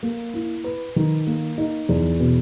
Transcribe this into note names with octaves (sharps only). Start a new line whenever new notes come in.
A#3
E4
B4
D#3
A#3
D#4
E2
B2